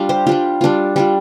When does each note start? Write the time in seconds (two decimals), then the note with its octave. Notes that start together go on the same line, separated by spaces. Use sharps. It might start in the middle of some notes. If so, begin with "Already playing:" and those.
Already playing: G3 D4 F4 F5
0.09 G4 C5
0.27 G3 D4 F4 G4
0.61 G3 D4 F4
0.96 G3 D4 F4